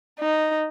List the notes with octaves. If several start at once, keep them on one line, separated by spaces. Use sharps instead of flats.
D#4